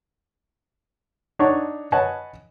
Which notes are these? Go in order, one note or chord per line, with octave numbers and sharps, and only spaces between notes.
D4 D#4 C#5 F#5 A5 C#6
B4 C#5 D#5 F#5 G#5 A5